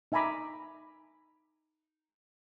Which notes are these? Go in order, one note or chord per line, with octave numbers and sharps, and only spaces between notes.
D#4 E5 G#5 A#5 B5 D6